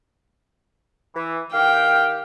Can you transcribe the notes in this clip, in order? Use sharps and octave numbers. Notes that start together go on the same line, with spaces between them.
E3
D#3 G4 F5 G5